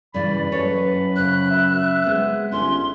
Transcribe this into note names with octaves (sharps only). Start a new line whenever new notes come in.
G2 C#3 E3 D5 B5
F#2 A4 B4 C#5
C#3 C5 F#6
E5
G#3 B3 C4
G1 C#4 D#4 C6